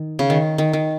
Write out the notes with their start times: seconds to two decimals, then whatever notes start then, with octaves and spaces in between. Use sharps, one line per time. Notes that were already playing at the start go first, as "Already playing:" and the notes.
Already playing: D#3
0.19 C#3
0.30 D#3
0.58 D#3
0.73 D#3